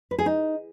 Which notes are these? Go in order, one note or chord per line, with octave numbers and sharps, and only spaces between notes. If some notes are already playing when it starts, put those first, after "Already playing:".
B4
G#4
D#4